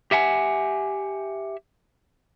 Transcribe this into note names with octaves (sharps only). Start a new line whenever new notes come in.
G4 E5 F#5 G#5